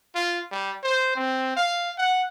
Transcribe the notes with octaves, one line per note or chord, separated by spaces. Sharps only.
F4
G3
C5
C4
F5
F#5